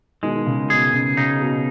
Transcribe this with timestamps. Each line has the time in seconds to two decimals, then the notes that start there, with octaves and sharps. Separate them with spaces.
0.23 B2 D#3 G#3
0.35 D#3
0.46 C#3
0.70 B2 G#4
0.93 C#3
1.17 C#3 D#4
1.41 B2